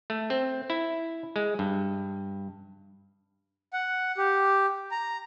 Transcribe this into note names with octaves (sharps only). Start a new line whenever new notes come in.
A3
C4
E4
G#3
G2
F#5
G4
A#5